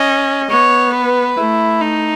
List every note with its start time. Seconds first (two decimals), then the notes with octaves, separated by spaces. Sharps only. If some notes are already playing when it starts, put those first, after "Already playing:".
Already playing: C#4 D#5
0.50 B3 C#5
0.94 B4
1.37 A3 E4
1.82 D#4